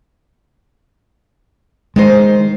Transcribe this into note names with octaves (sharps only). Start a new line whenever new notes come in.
D#3 G#3 D#4 C5